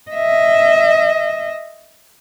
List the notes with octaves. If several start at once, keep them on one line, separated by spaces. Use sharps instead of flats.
D#5 E5